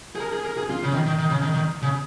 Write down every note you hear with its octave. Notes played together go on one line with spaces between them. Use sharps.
G#4
A#4
G#4
A#4
G#4
F4
C#3
D#3
D#3
D#3
C#3
D#3
D#3
C#3